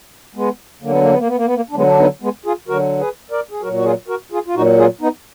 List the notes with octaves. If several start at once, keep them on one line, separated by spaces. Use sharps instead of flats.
G#3 B3
D3 F#3 A#3
B3
A#3
B3
A#3
B3
A#3
B3
A#3
D4
D3 F#3 G#3 B3
D4
B3 D#4
G#3 B3
F4 G#4
D3 F#3 F#4 A#4
G#4 B4
A#4 D5
G#4
A#2 F#3 F#4 A#4
F#4
F4 G#4
F#4 A#4
F4 G#4
F4
A#2 F#3 D#4 F#4
F4 G#4
B3 D#4